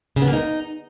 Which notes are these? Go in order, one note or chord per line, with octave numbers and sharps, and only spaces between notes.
C#3
B3
A#3
D#4